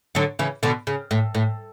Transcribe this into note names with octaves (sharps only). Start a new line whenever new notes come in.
D3 F#3
C#3 E3
B2 D3
C#3
A2
A2